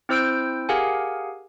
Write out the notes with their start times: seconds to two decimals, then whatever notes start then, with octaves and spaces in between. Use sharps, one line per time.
0.09 C4 E4 C5 E6 G6 D7
0.69 G4 G#4 A#4 F5 F#5 G#5